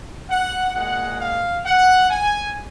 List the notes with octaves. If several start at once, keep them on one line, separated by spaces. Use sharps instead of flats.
F#5
A#2 G#3 F#5
F5
F#5
G#5